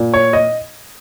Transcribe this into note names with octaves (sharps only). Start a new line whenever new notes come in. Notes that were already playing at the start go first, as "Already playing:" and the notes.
Already playing: A#2
C#5
D#5